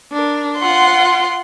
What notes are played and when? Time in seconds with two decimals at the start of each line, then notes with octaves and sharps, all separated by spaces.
0.12 D4 A#4
0.59 F4 F#5 C6